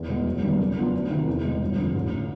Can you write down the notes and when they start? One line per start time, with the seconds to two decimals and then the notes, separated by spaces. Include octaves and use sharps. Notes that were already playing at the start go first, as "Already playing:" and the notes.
Already playing: E2
0.08 B2 G#3 B3
0.25 F#1
0.42 F#2 D#3 G3 B3
0.59 C#3
0.77 F#3 B3 D4 F4
0.94 D2
1.11 C3 D#3
1.27 E2
1.44 B2 G#3
1.61 G1
1.78 F2 D3
1.94 A1
2.13 D3